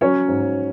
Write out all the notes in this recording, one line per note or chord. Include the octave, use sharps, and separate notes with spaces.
F#3 C#4 C#5
G#2